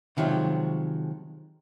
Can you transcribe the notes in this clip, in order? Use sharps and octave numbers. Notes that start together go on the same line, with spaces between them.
C3 D#3 F3 F#3 G#3